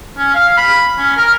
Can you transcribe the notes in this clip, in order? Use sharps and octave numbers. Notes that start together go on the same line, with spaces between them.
C#4
F5
B5
C#4
A#4